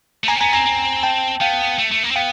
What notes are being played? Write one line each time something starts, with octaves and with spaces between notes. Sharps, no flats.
A3
A#3 G#5 A#5
C4
B3 G#5 A#5
C4 G#5 A#5
C4
G5 A5
B3 F5 G5
A3
A3
A#3
C4
B3 F5 G5